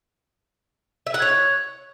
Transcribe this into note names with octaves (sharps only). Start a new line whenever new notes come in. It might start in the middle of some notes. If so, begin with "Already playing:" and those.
E5
F#5
C#5